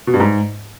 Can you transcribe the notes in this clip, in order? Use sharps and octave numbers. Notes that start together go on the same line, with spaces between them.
B2
G2
G#2